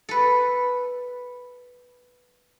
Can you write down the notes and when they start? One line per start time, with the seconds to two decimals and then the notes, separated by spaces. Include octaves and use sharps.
0.09 A4 B4